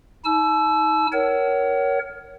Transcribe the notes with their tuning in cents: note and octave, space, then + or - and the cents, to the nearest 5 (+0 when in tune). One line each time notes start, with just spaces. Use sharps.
D#4 +35 A5 -40 E6 +15
A#4 +10 C#5 +10 F#5 +40